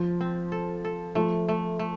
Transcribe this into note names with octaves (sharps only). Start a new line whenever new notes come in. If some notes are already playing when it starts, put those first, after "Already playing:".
Already playing: F3
C4
A4
A4
F3 A3
A3
A3